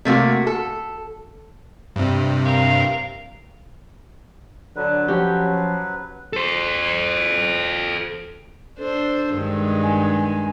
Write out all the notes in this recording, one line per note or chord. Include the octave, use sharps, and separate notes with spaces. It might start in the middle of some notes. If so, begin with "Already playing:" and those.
C3 A3 A#3 F#4
A4
G2 C3
A#4 F5
D3 F#3 B4
F3 C#4 F#4 G4
A4 C5
D4 A4 C5
G2 D#3 G#3
G#5